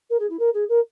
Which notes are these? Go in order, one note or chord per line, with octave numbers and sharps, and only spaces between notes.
A#4
G#4
E4
A#4
G#4
A#4